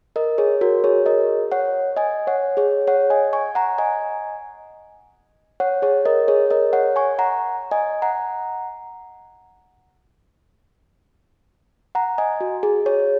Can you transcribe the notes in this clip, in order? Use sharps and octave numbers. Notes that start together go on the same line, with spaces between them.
A#4 D#5
G#4 C#5
F#4 A#4
G#4 C#5
A#4 D#5
C#5 F#5
D#5 G#5
C#5 F#5
G#4 C#5
C#5 F#5
D#5 G#5
G#5 C#6
F#5 A#5
D#5 G#5
C#5 F#5
G#4 C#5
A#4 D#5
G#4 C#5
A#4 D#5
C#5 F#5
G#5 C#6
F#5 A#5
D#5 G#5
F#5 A#5
F#5 A#5
D#5 G#5
F#4
G#4
G#4 C#5